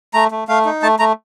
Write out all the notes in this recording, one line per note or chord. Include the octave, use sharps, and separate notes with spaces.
A3 A#5
A3
A3 F5
D#4
A3 A5
A3 A#5